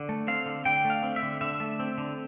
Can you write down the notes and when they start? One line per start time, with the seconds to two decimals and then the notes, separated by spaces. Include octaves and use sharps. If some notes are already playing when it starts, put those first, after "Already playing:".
Already playing: D3
0.09 A3
0.28 C4 F5
0.46 D3
0.65 D3 G5
0.85 A3
0.90 F5
1.03 C4
1.16 E5
1.23 D3
1.41 D3 E5
1.60 A3
1.79 C4
1.98 D3